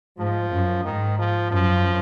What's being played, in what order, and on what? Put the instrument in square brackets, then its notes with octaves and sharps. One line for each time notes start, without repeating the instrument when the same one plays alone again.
[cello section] G#2 [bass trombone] F3
[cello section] F#2
[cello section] G#2 [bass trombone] D#3
[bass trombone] F3
[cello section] F#2 [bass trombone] F3